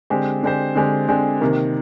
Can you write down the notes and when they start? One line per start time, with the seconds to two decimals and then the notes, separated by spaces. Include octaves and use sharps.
0.10 D3 G#3 C4 G4 C5
0.43 D3 G#3 C4 G4 C5
0.75 D3 G#3 C4 G4 C5
1.08 D3 G#3 C4 G4 C5
1.41 C3 D#3 A#3